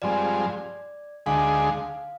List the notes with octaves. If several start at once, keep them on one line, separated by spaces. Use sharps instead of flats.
G2 F3 G#3 C4 D5
D2 D3 G#3 D#4 G#4 F5